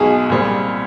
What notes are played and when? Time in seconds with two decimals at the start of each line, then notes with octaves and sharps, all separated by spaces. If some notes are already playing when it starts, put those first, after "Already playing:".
Already playing: B1 B2 G#3 G#4
0.30 C2 A#2 G3 C4